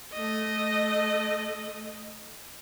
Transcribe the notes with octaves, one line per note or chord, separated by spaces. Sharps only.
A3 D#5